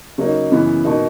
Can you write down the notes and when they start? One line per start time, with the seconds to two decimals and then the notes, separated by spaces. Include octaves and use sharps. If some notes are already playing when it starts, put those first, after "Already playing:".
0.18 C#3 F#3 A#3 D#4
0.52 F#2 C#3 E3 B3
0.85 B2 A#3 D#4